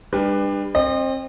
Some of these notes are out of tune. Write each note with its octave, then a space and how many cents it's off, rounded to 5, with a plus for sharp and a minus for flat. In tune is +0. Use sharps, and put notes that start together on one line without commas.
G3 +35 D4 +20 B4 +0
C4 +25 D#5 -35